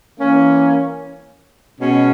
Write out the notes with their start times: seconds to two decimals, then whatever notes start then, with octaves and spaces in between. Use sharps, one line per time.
0.18 E3 A#3 C#4
1.79 B2 G#3 C#4